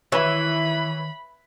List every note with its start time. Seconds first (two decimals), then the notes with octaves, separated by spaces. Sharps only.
0.12 D#3 E3 B4 C#5 B5